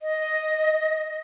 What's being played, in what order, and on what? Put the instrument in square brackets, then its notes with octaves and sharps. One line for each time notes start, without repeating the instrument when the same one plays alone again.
[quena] D#5